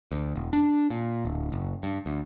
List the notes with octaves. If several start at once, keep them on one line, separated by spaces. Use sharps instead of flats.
D2
E1
D4
A#2
D1
F#1
G2
D2